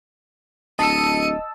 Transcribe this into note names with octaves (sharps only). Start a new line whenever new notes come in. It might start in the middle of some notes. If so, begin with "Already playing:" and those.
D1 D#5 A5 E6 C#7 D#7